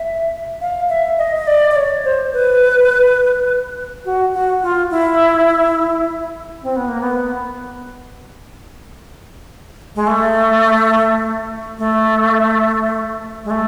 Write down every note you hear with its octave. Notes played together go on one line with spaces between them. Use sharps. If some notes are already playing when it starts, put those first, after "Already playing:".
Already playing: E5
F5
E5
D#5
D#5
D5
D5
C#5
C5
B4
F#4
F#4
F4
E4
C4
B3
A#3
B3
G#3
A3
A3
G#3
A3